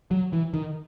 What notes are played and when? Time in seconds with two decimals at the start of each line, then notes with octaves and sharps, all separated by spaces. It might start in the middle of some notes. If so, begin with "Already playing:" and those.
0.11 F#3
0.33 E3
0.54 D#3